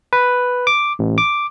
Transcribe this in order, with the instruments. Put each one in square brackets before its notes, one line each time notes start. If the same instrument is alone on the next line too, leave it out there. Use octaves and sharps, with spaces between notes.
[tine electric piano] B4
D6
A1
D6